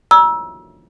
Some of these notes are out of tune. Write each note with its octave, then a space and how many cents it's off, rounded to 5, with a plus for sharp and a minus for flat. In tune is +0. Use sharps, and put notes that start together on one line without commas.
A#5 +40 E6 +0